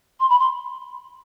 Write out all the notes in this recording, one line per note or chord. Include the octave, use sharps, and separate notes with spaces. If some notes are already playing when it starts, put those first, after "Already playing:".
C6
B5
C6